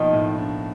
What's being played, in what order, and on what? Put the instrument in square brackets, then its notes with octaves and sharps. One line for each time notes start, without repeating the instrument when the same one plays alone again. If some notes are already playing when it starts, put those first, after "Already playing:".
Already playing: [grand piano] B2 F3 A#3 D#4 [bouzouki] D#3
[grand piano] A2
D4